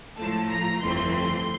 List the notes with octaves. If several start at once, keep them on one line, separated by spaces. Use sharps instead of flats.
A2 F3 A3 A5
A#5
G1 F2 E3 A3 C4 C6
C6